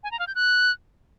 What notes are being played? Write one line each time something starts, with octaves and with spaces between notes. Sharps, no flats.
G#5
A#5
F5
G6
F#6